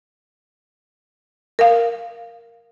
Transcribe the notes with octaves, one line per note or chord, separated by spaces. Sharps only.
A#4 F5